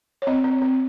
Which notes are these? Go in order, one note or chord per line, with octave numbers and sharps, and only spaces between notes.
C#5
C4 D#5
C4
C4